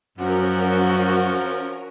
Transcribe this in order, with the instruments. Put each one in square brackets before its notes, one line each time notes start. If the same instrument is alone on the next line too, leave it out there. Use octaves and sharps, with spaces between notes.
[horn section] F#2 [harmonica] F3 [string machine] C#4 A#4 [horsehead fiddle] F#4